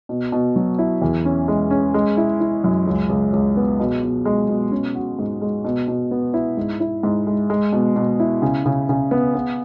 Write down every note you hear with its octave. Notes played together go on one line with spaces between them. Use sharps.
B2
B2
F#3
E4
E2
C#4
G#3
C#4
G#3
E4
E4
F#2
C#2
C#2
C#2
B3
B2
B2
G#3
B2
C#4
F#4
G#2
G#3
B2
B2
B3
E4
G#2
E4
G#2
G#3
G#3
B2
B2
E4
C#3
C#3
C#3
B3
B3